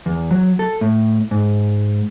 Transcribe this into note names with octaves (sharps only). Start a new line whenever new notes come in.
E2
F#3
A4
A2
G#2